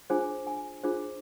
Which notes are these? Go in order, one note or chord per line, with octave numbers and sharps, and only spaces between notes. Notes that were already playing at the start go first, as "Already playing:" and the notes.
D4 F4 G#4 C5 G#5
G#5
D4 F4 G#4 C5